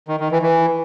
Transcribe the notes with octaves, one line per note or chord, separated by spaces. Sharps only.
D#3
D#3
E3
E3